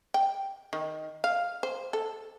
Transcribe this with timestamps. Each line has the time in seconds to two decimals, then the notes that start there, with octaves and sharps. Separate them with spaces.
0.14 G5
0.73 D#3
1.24 F5
1.63 C5
1.93 A4